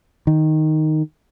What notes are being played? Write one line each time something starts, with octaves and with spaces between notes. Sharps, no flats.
D#3